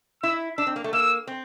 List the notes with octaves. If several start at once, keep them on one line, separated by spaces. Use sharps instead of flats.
E4 E6
D4 E6
C4
A#3
A3
A#3 E6
C4